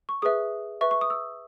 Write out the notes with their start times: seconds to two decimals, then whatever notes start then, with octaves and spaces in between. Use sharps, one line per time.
0.09 C#6
0.22 G#4 B4 E5 D#6
0.81 B4 E5 C#6
0.91 C#6
1.01 D#6
1.10 E6